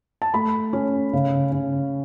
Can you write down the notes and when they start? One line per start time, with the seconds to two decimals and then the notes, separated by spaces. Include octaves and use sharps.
0.22 A5
0.34 A3 B5
0.73 C#4
1.13 C#3
1.52 C#3